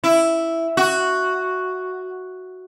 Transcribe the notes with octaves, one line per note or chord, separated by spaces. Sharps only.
E4
F#4